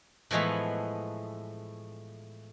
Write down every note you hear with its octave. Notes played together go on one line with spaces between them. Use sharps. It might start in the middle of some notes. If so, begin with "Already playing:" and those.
A2 E3 F3 G#3 A3 B3